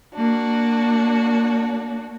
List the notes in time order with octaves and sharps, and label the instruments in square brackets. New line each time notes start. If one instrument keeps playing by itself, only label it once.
[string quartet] A#3 D4 F#4